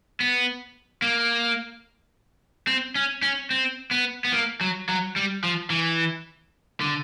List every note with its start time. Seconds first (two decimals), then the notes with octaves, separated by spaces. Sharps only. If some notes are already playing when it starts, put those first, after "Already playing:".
0.20 B3
1.02 A#3
2.67 C4
2.95 C#4
3.22 C#4
3.51 C4
3.91 B3
4.25 B3
4.33 A#3
4.61 F#3
4.89 F#3
5.16 G3
5.44 F3
5.70 E3
6.80 D3